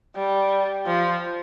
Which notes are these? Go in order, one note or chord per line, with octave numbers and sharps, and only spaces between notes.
G3
F3